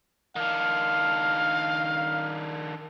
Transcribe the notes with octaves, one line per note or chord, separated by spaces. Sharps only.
D#3 D4 F5